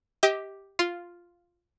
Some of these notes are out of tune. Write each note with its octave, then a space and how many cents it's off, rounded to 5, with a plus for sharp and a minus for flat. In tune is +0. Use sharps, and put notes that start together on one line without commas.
G4 +0 D#5 +35 D6 +10
F4 +0 C6 +0